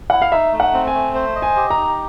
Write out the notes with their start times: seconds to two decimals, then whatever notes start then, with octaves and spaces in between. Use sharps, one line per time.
0.10 E4 F#5
0.22 F5
0.32 D#4 E5
0.52 A3
0.60 F#5
0.74 C4
0.87 G#5
0.94 A3
1.15 C5
1.36 D#5
1.42 G#5
1.56 G4
1.70 A#5
1.77 D#4